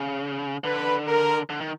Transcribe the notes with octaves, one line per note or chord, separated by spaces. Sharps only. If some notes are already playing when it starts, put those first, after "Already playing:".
Already playing: C#3
D3 B4
A#4
D3
D#3